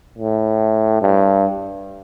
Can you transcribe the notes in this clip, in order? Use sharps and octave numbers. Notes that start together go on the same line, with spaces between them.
A2
G2